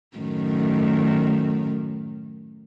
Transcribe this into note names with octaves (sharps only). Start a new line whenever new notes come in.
F#2 A2 D#3